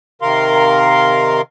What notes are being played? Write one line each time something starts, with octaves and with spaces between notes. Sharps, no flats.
C3 D#3 A#4 F5 C6